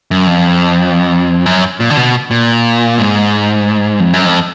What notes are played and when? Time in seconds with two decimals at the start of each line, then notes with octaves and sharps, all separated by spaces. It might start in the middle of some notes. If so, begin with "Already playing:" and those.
0.11 F#2
0.27 F2
1.46 F#2
1.80 A#2
1.90 D3
1.97 B2
2.31 A#2
2.98 G#2
4.00 F2
4.13 F#2
4.25 F2